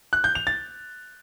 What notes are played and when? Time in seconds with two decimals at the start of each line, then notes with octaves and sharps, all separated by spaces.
0.13 F#6
0.24 G6
0.35 F7
0.47 A6